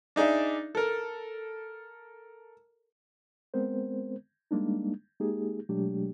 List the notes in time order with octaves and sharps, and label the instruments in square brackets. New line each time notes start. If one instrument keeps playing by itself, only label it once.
[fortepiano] D4 D#4 G#4 D5 E5
A4 A#4
[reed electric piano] G#3 B3 C4 A#4 C5
G3 G#3 A#3 D4 D#4
G#3 A#3 D#4 G4 G#4
B2 F#3 G#3 A3 D4 G4